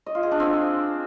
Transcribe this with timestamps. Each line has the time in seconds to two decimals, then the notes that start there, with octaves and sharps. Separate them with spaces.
0.06 D#5
0.15 F4
0.23 G#4
0.31 D4
0.40 C4